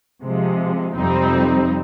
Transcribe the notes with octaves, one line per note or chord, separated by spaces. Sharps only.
C3 F3 G#3
F2 C3 G3 C4 D#4